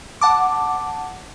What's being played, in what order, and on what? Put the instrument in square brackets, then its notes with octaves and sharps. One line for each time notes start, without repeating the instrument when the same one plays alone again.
[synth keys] F#5 A5 D6